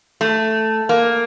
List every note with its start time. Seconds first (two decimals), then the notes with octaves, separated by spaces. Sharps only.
0.21 A3
0.89 A#3